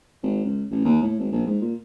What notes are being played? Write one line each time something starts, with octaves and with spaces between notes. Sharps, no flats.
G#1
C#2
A1
D#2
A2
G#1
A#1
G#2
A#2